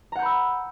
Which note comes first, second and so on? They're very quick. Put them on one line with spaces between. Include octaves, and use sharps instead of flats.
A#5 F#5 G6 B5 E6